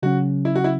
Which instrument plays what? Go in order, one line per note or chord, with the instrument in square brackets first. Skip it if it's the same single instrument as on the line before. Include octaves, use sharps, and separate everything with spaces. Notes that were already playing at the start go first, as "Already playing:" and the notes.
[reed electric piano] C#3 F#3 C#4 [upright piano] F#4
[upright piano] E4
F#4
E4